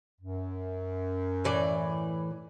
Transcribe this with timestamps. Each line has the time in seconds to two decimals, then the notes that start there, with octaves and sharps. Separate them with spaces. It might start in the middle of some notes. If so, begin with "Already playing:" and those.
0.21 F#2
1.44 A2 E3 D5